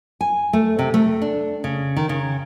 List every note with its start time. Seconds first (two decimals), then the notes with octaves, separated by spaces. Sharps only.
0.21 G#5
0.53 A3
0.79 C3
0.94 A3
1.22 D4
1.64 C#3
1.96 D#3
2.09 C#3